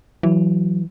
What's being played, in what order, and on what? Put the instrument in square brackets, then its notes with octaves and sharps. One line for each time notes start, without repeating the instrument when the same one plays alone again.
[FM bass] E3 [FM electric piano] F#3